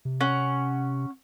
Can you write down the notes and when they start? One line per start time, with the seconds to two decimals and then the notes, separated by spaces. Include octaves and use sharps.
0.05 C3
0.21 C#4 F#5